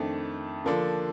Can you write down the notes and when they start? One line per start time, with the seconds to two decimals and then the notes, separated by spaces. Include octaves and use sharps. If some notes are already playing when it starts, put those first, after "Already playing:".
Already playing: F2 D#3 A3 D4
0.65 D3 F3 A#3 D4 A4